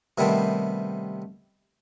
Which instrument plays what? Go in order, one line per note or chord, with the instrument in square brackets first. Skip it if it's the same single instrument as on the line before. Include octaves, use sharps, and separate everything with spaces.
[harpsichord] C3 D#3 G3 A3 B3 C4